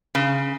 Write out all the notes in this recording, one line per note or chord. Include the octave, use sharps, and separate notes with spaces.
C#3